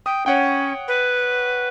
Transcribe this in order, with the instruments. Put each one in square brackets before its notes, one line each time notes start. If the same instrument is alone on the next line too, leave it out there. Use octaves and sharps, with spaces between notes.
[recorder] G5 [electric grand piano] D#6
[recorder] C#4 [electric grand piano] C#5 F#5 G5
[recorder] B4